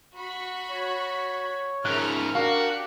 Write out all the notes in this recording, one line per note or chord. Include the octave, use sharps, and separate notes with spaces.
F#4 B5 C#6
C#5
G#2 C#3 A#4 E5 F6 F#6
D4 F#4 G4 A#4 F5